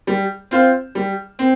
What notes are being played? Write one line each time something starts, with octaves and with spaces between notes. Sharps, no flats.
G3
C4 F4 C5
G3
C4